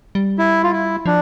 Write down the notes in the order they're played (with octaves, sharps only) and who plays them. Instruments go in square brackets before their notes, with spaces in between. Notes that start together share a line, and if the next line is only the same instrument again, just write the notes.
[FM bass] G3
[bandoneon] E4
F4
E4
[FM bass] F3 [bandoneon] D4